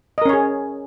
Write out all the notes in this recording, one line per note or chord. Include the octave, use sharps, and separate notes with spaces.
C#4 G#4 A#4 C#5 D#5